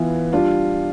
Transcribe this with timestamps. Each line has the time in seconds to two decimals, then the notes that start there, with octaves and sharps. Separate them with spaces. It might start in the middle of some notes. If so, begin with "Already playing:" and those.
Already playing: E3 B3 F4
0.33 G3 D4 F4